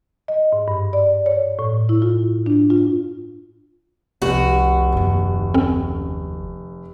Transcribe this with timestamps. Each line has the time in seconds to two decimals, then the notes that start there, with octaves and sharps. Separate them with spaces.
0.28 D#5
0.53 G#2
0.68 G2
0.93 D5
1.26 C#5
1.59 A2
1.89 E4
2.02 F4
2.46 D4
2.70 F4
4.22 F1 C2 F#4
4.92 F#1 D#2
5.54 C4 C#4 A4